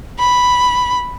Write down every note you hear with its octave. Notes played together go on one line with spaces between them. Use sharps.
B5